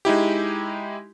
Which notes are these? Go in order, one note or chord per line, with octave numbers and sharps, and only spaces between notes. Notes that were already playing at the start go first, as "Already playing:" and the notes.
G#3 D#4 E4 G4